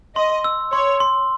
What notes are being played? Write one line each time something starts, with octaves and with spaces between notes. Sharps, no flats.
D#5 C6
E6
C#5 C6
C6